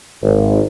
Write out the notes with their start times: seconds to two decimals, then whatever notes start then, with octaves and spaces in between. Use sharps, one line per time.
0.23 G#1